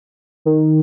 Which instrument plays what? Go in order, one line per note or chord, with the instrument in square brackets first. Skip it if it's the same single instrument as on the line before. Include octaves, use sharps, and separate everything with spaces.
[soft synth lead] D#3